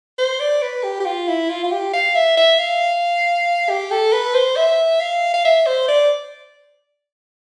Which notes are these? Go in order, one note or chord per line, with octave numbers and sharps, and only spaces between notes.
C5
D5
B4
G4
G4
F4
E4
F4
F4
G4
F5
E5
E5
F5
G4
A4
B4
C5
E5
F5
F5
E5
C5
D5